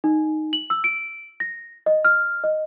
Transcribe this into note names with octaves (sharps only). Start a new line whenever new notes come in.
D#4
F#7
E6
D7
A#6
D#5
F6
D#5